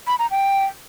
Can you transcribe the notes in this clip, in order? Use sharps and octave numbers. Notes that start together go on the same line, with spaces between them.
B5
A#5
G5